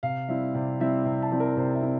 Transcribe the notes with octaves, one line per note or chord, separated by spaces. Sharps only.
C3 F5
G3 C4 E4 E5
C3 D5
G3 C4 E4 E5
C3
A5
G3 C4 E4
A#4
C3 C5
E5
C4 E4